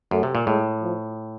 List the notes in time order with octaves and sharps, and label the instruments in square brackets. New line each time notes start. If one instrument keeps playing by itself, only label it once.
[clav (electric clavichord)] F#2 [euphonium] A3
[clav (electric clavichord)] C3
A#2
[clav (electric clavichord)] A2 [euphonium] G#3
[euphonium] F3